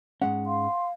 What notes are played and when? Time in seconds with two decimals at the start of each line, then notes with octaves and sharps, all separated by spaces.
0.22 G#2 G#3 C#4 F#5
0.46 F5 C6